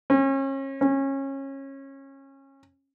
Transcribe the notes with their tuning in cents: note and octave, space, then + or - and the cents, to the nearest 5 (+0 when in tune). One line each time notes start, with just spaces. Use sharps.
C#4 -35
C#4 -25